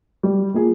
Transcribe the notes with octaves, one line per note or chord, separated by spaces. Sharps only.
G3
A#3 F4 G#4